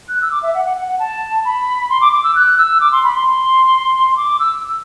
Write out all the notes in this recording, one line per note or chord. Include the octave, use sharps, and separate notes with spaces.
F#6
E6
D6
E5
F#5
F#5
F#5
F#5
A5
B5
C6
D6
D6
E6
F#6
E6
D6
C6
B5
C6
C6
D6
E6